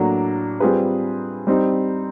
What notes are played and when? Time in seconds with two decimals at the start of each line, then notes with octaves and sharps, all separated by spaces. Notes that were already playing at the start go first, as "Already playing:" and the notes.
Already playing: A2 F#3 A#3 D4
0.60 G3 C4 F4 G#4 B4
1.47 G3 C4 D#4